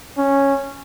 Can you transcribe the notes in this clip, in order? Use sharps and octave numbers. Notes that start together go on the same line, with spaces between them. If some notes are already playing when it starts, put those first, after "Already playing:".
C#4